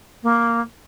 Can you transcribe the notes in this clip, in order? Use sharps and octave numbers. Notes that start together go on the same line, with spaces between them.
A#3